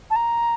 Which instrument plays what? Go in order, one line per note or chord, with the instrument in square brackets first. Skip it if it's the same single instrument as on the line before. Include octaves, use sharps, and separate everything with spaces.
[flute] A5
A#5